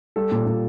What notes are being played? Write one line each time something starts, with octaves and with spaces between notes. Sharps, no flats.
G3 A4
A#2
A#2